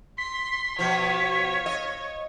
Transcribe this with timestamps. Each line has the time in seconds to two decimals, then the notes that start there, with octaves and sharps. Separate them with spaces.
0.18 C6 B6
0.79 B2 F3 C#5
1.66 D#5